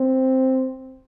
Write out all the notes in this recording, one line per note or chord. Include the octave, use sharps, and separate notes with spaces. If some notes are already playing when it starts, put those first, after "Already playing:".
Already playing: C4